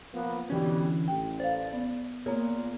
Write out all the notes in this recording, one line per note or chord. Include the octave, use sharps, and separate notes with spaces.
F3 A#3 B3
G#1 B2 D3 E3 G3 C#4
A1 G5
C5 D5 F5
B3
A#2 A#3 B3 G#4 A#4 C#5